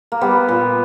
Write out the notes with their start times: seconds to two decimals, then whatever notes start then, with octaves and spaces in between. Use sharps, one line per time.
0.12 A#3
0.21 G3 B3
0.48 A#2